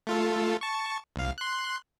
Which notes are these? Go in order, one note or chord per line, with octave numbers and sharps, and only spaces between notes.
A3 F4 A4
A5 C#6
C2 F5
C6 F#6